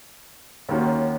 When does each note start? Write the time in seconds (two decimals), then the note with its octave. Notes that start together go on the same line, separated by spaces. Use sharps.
0.69 D#2 D#3 A#3 C#4 F#4